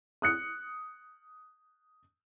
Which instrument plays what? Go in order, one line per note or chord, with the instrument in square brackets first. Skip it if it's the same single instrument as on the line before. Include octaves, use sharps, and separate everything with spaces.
[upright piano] D#6 F#6 C#7